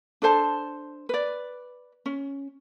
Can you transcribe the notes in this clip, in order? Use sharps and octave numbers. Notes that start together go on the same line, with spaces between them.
D4 A4 C5 A5
B4 D5
C#4